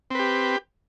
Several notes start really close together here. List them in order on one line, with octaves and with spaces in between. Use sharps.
C4 B4 G4